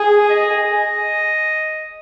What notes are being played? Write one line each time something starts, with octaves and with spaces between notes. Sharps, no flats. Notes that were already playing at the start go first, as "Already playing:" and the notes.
Already playing: G#4
D#5